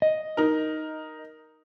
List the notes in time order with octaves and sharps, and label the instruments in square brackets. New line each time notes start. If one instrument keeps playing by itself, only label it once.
[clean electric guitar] D#5
[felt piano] D#4 A#4